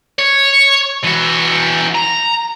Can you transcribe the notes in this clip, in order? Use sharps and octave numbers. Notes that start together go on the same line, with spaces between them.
C#5
E3 F#4
A#5